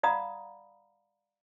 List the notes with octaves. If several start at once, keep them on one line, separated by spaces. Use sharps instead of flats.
D5 F5 F#5 A#5 B5 D#6